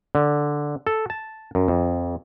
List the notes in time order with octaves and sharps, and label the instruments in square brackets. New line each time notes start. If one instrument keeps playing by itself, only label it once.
[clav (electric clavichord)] D3
A4
A5
F#2
F2